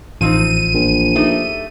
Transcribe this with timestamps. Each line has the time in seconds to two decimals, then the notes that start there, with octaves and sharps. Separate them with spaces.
0.21 A1 F3 C4 D#4 D#7
0.74 A#1
1.15 A3 D#4 G4